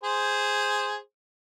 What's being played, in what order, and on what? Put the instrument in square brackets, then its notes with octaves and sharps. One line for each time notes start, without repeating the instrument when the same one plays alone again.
[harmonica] G#4 C5